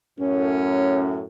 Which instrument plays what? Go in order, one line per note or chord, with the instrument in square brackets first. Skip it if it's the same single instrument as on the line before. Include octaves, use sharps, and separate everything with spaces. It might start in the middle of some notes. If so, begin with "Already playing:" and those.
[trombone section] F#2 A2 [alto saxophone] C#4